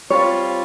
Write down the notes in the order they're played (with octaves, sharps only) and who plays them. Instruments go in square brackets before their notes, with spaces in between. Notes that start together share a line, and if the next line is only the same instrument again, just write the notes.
[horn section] G3 C4 F4 [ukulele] C#5